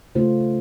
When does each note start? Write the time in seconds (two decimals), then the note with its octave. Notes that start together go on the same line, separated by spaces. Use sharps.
0.15 C#3 A3 C#4 F4 C5